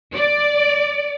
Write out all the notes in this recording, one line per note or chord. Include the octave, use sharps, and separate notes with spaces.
D5